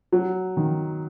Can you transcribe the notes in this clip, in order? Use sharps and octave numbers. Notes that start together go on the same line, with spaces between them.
F#3
D#3